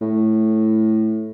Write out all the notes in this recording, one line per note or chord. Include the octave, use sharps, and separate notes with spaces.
A2